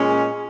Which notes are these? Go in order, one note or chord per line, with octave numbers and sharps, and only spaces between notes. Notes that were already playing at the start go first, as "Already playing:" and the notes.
Already playing: A#2 G#3 C#4